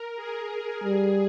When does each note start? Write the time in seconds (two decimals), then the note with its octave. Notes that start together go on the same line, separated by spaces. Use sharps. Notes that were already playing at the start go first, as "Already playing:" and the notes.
Already playing: A#4
0.16 G#4
0.84 G3 G#4